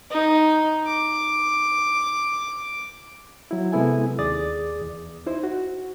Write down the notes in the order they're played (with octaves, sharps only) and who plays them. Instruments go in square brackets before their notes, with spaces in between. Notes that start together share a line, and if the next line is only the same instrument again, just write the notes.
[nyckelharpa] D#4
D6
[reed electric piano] F#3 E4
C3 G#3 B3 E4 A4 G#5
D#2 G#4 D5 D6 D#6 A6
E2
D#4 E4 C5
F#4